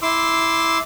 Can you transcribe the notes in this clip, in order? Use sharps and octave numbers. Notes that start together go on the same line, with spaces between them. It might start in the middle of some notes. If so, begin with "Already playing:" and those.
E4 C6 D6 E6